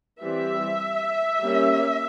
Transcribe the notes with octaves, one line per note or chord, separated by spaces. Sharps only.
E3 G3 C4 E5
G3 A#3 C#4